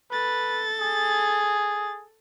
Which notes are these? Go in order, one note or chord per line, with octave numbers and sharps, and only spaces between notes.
A4 B4 A6
G#4